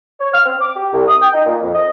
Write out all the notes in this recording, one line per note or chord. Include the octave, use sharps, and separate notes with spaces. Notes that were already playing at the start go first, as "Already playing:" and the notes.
C#5
F6
C4
D6
G4
C2
D#6
G5
D#4
A#2
F2
D#5